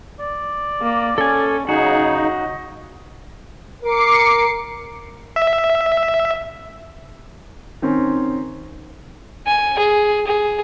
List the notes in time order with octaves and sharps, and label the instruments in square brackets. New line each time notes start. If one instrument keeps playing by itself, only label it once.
[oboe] D5
[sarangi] A#3
[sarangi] C#4 [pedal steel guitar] A4 G#5
[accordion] C#3 D#4 [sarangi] F#3 [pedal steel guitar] F#4 [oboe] G#4
[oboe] D#5
[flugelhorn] A#4 [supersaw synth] D6 C7 C#7
[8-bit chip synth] E5
[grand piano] D#3 C4 C#4
[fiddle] G#5
G#4
G#4